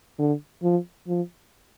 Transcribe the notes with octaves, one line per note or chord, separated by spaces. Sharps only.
D3
F3
F3